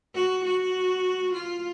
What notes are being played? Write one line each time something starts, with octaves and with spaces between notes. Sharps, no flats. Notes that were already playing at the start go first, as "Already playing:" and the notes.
F#4
F#4
F4